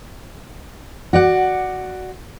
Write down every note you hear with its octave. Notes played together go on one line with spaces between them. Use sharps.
F#4 D5 F#5